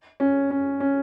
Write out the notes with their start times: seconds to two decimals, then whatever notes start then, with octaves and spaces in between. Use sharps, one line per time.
0.20 C#4
0.50 C#4
0.80 C#4